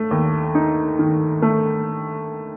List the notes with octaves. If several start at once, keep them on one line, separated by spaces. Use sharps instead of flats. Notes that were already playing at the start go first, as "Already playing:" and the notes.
Already playing: A3
D#2
D#4
D#3
A3